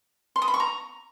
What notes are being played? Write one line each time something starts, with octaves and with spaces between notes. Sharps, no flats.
C6
D#6
B5
C#6
A#5